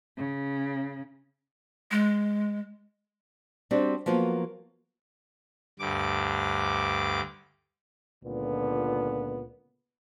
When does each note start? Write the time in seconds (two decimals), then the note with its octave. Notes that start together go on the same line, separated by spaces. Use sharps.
0.17 C#3
1.91 G#3
3.71 G3 C4 D4 F#4 G4
4.06 F3 F#3 A#3 B3 F4 A#4
5.79 D2 G2 D6
8.24 C#2 A#2 D3 B3